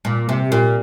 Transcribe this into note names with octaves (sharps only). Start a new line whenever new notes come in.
A#2
C3
A#2